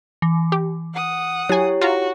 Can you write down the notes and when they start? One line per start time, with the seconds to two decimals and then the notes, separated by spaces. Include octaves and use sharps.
0.22 E3
0.52 G4
0.94 F#5 D#6
1.49 F#3 E4 G4 C#5 G#5
1.81 F4 F#4 A#5